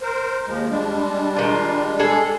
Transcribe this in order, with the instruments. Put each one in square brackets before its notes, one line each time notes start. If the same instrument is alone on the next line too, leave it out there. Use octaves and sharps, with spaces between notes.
[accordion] A#4 C5
D#2 F3 G#3
G3 G#3 D4
[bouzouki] D#3 F4
G#4 A4